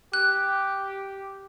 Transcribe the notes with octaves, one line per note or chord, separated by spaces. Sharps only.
G4 F#6